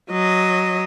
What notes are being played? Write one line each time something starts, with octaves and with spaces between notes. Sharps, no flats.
F#3 D#5